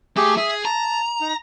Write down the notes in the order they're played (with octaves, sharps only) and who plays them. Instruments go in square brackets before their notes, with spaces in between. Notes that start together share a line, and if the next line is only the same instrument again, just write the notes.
[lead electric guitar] A3 [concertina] G4 G#4
[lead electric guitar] G#4 [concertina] E5
[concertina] A5 [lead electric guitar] A#5
[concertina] D#4